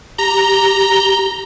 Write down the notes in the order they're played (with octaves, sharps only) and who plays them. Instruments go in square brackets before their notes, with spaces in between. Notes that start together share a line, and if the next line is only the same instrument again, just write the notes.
[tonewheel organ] G4 [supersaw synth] A#5